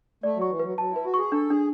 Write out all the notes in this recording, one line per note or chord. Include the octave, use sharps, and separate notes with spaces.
A3 D5
F#3 C#6
E3
B4
F#3
F#3 A5
E4
B4
F#4
G#4 C#6
D4 A4
D4 G#4